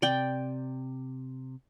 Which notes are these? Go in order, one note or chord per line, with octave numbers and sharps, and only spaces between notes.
C3 D5 G5